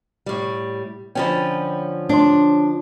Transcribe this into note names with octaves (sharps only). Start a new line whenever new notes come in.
A2 G3
D3 F3 C#4 G5 B5
D4 C#5 C6